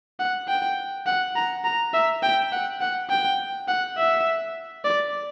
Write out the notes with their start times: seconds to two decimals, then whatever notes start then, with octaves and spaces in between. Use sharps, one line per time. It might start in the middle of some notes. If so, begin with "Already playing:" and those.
0.19 F#5
0.48 G5
1.06 F#5
1.36 A#5
1.64 A#5
1.94 E5
2.23 G5
2.52 F#5
2.81 F#5
3.10 G5
3.68 F#5
3.97 E5
4.84 D5